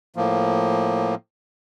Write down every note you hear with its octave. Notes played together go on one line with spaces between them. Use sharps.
A2 F3 A#3